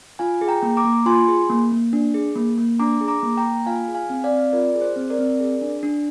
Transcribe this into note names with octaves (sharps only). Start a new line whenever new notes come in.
F4 F5 G#5
G#4
G5 A#5
A#3
A#5 D6
A#3
F4 G#5 C6
G#4
A#3
A#3
D4
G#4
A#3
A#3
D4 A#5 D6
G#4
A#5 D6
A#3
G5 A#5
A#3
F4 F5 G#5
G#4
F5 G#5
C4
D5 F5
C4
F4 A#4 D5
G#4
C5
C4
A#4 D5
C4
G#4
D4
D4